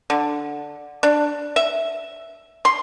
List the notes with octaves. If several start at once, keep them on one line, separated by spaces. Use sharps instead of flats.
D3
D4
E5
C6